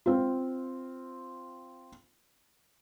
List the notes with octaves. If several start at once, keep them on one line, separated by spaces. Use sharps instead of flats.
C4 F4